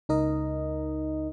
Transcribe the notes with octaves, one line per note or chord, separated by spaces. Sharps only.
C#2 D#4 A#4 D#5